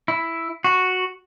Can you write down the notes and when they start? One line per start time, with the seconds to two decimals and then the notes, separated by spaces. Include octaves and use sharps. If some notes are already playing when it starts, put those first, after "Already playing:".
0.08 E4
0.64 F#4